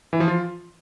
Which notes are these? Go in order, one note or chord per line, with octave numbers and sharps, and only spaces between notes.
E3
F3
F4